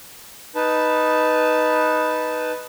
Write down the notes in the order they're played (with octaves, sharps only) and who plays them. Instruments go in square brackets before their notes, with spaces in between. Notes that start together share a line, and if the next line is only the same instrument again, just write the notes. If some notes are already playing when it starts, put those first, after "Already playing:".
[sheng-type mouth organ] D#4 B4 A5